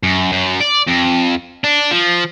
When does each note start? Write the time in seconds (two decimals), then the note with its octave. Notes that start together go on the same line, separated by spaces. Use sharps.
0.03 F#2
0.32 F#2
0.60 D5
0.87 F2
1.64 D4
1.91 F3